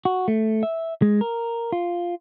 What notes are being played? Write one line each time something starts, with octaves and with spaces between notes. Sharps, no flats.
F#4
A3
E5
G#3
A#4
F4